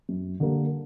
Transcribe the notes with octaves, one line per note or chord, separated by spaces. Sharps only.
F#2
D3 G3 A#3